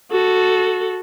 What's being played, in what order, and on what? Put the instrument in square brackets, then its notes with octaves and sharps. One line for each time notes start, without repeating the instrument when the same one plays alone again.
[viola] F#4 A4